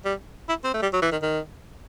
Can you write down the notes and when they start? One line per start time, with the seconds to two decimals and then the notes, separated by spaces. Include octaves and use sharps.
0.05 G3
0.49 E4
0.64 C4
0.74 A3
0.82 G3
0.93 F#3
1.02 E3
1.11 D#3
1.22 D#3